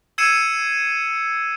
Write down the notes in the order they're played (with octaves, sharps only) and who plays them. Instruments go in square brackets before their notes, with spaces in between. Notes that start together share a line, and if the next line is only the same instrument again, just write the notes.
[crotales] E6 G#6 C7 C#7 D#7 E7